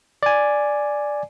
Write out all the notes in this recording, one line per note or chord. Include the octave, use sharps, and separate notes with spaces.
D5 G#5